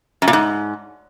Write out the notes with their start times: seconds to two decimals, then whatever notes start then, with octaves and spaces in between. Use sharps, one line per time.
0.22 F#2
0.28 A#2
0.33 G#2